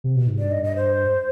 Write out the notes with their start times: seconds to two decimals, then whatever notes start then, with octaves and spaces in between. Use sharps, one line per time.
0.04 C3
0.16 B2
0.27 G#2
0.39 G2 D5
0.51 D#5
0.64 D#5
0.76 C5